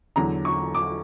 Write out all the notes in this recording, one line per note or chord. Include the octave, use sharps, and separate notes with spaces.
E2 D3 F#3 A#5
C#6
D6